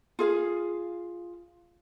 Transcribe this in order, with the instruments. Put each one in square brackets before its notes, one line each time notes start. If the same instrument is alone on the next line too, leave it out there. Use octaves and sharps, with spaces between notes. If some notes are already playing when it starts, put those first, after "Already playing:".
[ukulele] F4 G#4 F5